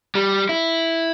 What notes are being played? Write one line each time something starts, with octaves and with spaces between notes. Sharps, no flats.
G3
E4